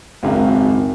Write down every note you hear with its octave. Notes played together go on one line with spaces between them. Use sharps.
G#1 C#2 F#2